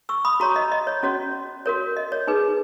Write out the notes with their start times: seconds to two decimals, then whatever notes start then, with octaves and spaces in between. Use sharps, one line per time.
0.09 C#6 E6
0.25 B5 D#6
0.40 F#4 C#5 A#5 C#6
0.56 D#5
0.72 D#5
0.87 C#5
1.03 C#4 F#4 C#5
1.66 F#4 A#4 C#5
1.97 D#5
2.12 C#5
2.27 D#4 G#4 B4